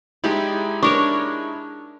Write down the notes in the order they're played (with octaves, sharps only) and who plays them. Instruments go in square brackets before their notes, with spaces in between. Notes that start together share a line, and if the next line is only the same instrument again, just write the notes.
[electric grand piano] G#3 D#4 E4 [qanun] G4 D5
[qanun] D4 A#4 C#5 [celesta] C#6 D6